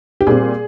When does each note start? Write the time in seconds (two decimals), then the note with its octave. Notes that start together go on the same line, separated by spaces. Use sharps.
0.21 G4
0.27 A#2 G3 C4 G#4